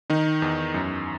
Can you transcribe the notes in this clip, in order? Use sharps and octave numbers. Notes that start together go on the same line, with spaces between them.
D#3 D#4
E2
F#2